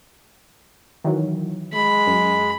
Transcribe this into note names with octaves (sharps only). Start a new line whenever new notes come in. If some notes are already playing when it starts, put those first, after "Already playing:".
D#3 E3 F#3
G#3 B5
F#2